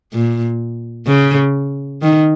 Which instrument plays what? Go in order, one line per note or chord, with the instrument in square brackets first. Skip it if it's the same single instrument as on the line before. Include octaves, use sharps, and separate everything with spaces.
[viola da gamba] A#2
C#3
D#3